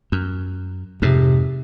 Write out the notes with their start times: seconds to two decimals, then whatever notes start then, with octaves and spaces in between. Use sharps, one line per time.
0.12 F#2
1.02 F2 G#2 C3